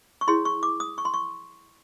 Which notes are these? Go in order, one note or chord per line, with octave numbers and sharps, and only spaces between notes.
C#6
E4 G#4 C#5 C6
C#6
D6
D#6
C#6
C6
C#6